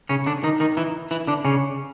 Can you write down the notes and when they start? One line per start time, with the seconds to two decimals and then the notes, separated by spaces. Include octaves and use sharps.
0.09 C#3 C#4
0.27 D3 D4
0.44 D#3 D#4
0.60 D#3 D#4
0.77 E3 E4
1.11 E3 E4
1.27 D3 D4
1.45 C#3 C#4